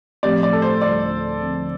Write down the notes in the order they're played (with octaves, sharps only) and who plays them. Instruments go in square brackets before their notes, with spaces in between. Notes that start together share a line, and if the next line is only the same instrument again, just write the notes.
[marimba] A2 F3 A3 C4 G4 [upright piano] D5
[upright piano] D5
A4
C5
[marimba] D2 D3 G3 F4 A4 [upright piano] D5
[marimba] D3 F3 C4